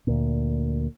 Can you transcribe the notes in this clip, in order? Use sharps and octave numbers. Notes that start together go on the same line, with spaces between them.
D2 A#2